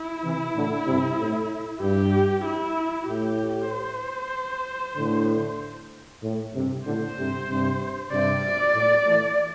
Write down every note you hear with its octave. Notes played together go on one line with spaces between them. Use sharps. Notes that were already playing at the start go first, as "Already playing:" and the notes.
Already playing: E4
C3 E3
A2 D3
G2 C3
A2
G2 G4
E4
A2 G4
C5
A2 D3
A2
G2 C3
A2 D3 C5
G2 C3
G2 C3
G2 C3 D5
A2
E3 A3